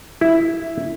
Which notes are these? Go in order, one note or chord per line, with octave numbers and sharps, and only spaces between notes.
E4